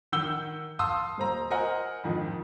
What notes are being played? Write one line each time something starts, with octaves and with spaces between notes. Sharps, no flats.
D#3 F#5 E6 G6 G7
F5 A5 C6 D#6 E6
D#1 C5 A#5
A#4 C5 D#5 F#5 G#5 F6
F2 G#2 D#3 F3